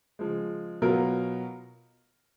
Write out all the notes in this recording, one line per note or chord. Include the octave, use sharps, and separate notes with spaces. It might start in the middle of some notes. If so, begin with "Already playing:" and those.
C#3 F3 G#3
B2 F#3 B3 F4 A#4